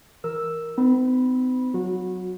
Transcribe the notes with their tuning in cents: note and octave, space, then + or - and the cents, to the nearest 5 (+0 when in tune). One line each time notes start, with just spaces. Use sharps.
E3 -5 A#4 +0 E6 +0
C4 -45 D#4 +0 B5 -10
F#3 +0 F#4 -25